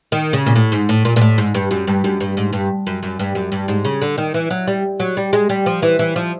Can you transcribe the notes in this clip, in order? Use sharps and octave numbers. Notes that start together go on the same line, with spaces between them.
D#3
C#3
A#2
A2
G#2
A2
A#2
A#2
A2
G#2
G2
F#2
G2
F#2
G2
G#2
G2
F#2
F#2
G2
F#2
G2
G#2
C#3
D3
D#3
E3
F#3
G3
F#3
G3
G#3
G3
F3
E3
E3
F3